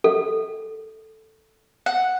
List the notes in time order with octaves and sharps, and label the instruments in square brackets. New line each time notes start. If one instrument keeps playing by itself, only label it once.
[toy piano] A4
[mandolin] F#5